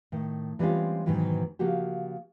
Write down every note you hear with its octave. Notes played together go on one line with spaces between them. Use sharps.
A2 D#3
E3 G3 G#3 C4 C#4 F4
G#2 B2 D#3 E3 F#3
C#3 F3 A#3 F#4 G4